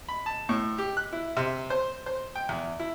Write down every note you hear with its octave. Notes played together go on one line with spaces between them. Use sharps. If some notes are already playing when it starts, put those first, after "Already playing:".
B5
A5
A2
G4
F#6
E4
C3
C5
C5
G5
E2
E4